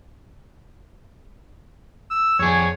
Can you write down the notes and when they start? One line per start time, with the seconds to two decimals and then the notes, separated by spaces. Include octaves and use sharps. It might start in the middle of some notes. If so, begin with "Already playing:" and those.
2.11 E6
2.39 F2 G#4 C#5